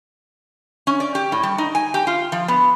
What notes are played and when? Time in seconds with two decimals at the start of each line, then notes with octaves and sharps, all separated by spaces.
0.87 C#4
1.00 D5
1.15 G4
1.32 A2
1.43 G3
1.58 D#4
1.75 G#5
1.94 G4
2.07 F4
2.32 F3
2.48 B3